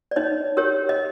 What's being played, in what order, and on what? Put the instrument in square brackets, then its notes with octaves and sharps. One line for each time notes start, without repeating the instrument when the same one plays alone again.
[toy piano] D5
D#4 C#5 D#5
G4 A#4 C#5
D#5